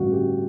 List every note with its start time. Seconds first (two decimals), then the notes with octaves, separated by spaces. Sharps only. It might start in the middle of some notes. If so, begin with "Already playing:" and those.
Already playing: A1 G2 D3 F#4
0.12 G4